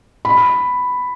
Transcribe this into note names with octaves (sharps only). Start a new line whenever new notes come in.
B5